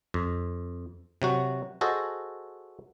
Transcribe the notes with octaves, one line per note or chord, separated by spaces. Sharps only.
F2
C3 F#3 F#4
F#4 G#4 A4 C5 D#5